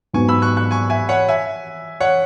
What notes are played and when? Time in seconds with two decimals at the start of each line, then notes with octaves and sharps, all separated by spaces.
0.13 G#2 F#3 B3 G#5 C#6
0.29 B5 E6
0.42 C#6 F#6
0.57 C#6 F#6
0.71 G#5 C#6
0.90 E5 G#5
1.09 C#5 F#5
1.28 E5 G#5
2.00 C#5 F#5